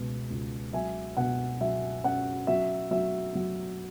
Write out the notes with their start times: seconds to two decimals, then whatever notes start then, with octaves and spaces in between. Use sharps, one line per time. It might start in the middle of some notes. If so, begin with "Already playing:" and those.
Already playing: C#2 B2 B3
0.30 C#2
0.73 F#3 E5 G#5
1.17 B2 F#5
1.61 F#3 E5
2.04 C#4 F#5
2.47 F#3 E5
2.91 F#3 E5
3.35 F#3